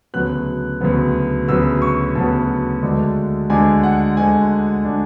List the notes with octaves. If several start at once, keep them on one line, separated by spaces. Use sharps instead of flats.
D2 C#3 F#3 B3 F#6
D2 C#3 F#3 B3
D2 C#3 F#3 B3 E6
C#6
D2 C#3 F#3 B3 A5
D2 D3 G#3 D4
D2 D3 G#3 D4 G#5
F#5
D2 D3 G#3 D4 G#5
D3 G#3 D4